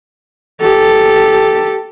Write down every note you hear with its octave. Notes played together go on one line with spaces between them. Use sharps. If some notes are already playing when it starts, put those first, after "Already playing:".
G4 A4